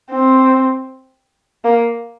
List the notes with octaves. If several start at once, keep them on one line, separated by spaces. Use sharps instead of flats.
C4
A#3